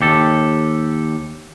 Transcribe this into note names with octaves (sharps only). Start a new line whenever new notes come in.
D#2 G4 A4